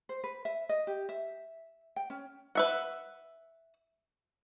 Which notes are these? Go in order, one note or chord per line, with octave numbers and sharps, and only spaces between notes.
C5
B4
E5
D#5
G4
E5
G5
C#4
B4 E5 F#5